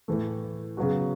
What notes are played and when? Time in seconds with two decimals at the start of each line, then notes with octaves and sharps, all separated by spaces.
0.08 A2 E3 A3
0.77 C#3 F#3 B3 F#4